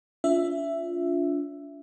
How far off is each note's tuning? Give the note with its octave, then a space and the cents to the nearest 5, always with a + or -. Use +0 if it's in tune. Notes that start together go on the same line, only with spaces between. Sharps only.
D4 -40 F4 +0 E5 +10